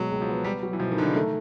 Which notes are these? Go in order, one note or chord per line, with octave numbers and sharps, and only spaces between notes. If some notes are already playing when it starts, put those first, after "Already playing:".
Already playing: B2 F#3 G#3
C#2
F3
B3
G3 B3
F#3
E3
B2 F3
D#3
D3 D#4
C#3
D#3 A3